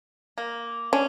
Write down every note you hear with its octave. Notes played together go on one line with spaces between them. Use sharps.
A#3
C#4 D4